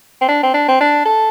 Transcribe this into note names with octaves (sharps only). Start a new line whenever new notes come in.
C4
D4
C4
D4
C4
D4
A4